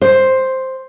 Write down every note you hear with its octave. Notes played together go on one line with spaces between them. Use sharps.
C5